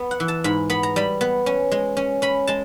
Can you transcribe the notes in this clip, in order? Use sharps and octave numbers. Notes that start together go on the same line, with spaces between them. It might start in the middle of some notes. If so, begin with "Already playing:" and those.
Already playing: B3
F#5
E3
A5
G#2 B5
B3 B5
A#5
G3 B5
B3
C#4
G#3
C#4
C#4 B5
G#3 A5